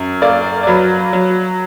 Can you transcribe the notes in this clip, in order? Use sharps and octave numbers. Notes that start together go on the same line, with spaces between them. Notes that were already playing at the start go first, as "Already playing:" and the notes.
Already playing: F#2
A#3 D5
D5
F#3 B4
F#3